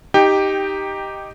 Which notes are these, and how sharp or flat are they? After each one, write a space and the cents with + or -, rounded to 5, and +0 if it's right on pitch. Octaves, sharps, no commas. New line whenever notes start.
D#4 +0 G4 +0 G5 +10